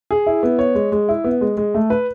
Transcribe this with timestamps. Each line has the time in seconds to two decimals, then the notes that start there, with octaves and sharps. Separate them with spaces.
0.11 G#4
0.27 E4
0.43 B3
0.59 C#5
0.75 G#3
0.92 G#3
1.09 E4
1.24 B3
1.41 G#3
1.57 G#3
1.74 A3
1.90 B4